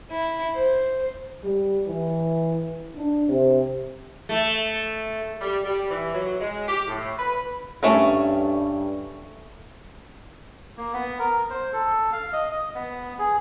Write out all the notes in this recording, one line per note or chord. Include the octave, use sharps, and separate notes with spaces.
E4
C5
G3
E3
D4
C3
A3
G3
G3
E3
F#3
G#3
G4
A2
B4
G2 A3 C#4 A#4
A#3
B3
A#4
C5
A4
F5
D#5
D#5
B3
G#4